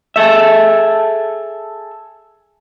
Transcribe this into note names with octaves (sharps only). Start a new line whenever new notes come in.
G#4 A4 E5